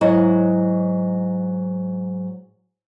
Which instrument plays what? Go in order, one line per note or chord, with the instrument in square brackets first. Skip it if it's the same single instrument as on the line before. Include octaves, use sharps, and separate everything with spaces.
[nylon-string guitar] G#2 F#3 E4 D#5